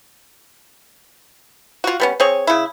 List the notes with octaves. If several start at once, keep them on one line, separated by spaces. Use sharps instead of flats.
F4 F#4
G3 B3 C#4
C4 G#4 C#5
C#3 E4